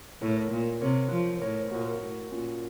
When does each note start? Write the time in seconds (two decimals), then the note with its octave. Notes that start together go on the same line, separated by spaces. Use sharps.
0.22 A2 A#4 C#5
0.37 A#4 C#5
0.51 A#2
0.82 C3 A#4 C#5
1.11 F3
1.36 C5
1.42 A2 A#4 C#5
1.61 C5
1.71 A#2 F#4 A#4
2.01 A2
2.31 A#2 C#4 F4